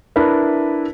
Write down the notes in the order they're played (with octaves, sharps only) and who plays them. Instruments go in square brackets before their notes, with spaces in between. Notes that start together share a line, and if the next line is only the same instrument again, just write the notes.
[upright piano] D4 E4 A#4 B4 E5